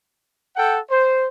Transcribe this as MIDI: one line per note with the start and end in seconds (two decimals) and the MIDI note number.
0.56 0.79 69
0.56 0.79 78
0.56 0.79 79
0.90 1.28 72